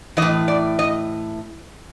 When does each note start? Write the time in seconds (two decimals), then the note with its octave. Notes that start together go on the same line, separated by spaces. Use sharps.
0.17 E3 D#5
0.22 A2
0.48 D5
0.79 D#5